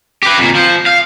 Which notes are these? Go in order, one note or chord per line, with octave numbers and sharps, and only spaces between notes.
G4 B4
F2 A#2
F3
F5